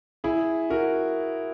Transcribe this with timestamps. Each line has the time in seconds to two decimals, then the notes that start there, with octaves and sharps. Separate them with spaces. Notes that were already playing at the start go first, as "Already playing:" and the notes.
0.24 E4 G#4
0.70 F#4 A#4